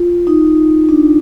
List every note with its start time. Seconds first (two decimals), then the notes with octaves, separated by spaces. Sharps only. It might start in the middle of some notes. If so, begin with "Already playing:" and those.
Already playing: F4
0.27 D#4
0.89 D4